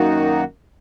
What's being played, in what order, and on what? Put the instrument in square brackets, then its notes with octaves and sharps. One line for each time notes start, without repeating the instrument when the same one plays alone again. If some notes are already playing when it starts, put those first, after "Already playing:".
Already playing: [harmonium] F#2 D#3 A#3 D#4 F#4